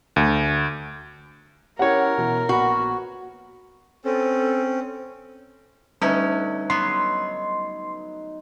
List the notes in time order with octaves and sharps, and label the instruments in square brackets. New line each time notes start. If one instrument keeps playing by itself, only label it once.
[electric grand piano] D2
[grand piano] C#4 E4 G4 [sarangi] A#4 [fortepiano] C#5 F#5
[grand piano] B2 E3
[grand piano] A#1 B3 B5 [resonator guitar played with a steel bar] F#4
[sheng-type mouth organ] C4 C#4 [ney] A4
[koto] D3 A3 C#4 [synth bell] G3 B4 [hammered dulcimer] D#4
[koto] F#3 B3 [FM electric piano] C6